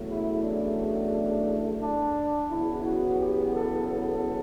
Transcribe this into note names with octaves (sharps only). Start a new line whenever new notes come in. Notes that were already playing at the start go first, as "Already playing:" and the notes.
Already playing: E2 C#3 F#3 A3
E4
D4
D4
E2 C#3 F#3 B3 E4
F#4
G4
A4
A4